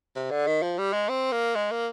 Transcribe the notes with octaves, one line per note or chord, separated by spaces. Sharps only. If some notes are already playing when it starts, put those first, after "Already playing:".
C3
D3
D#3
F3
G3
G#3
C4
A#3
G#3
A#3